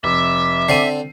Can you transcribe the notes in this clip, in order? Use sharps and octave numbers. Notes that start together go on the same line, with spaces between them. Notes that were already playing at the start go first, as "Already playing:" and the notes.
F1 E5 D6
D3 C4 C7 D#7